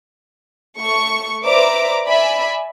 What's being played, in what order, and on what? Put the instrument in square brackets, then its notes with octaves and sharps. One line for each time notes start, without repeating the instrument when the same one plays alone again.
[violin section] A3 C#6
B4 C5 D5 E5 A#5 D6
D5 E5 G#5 B5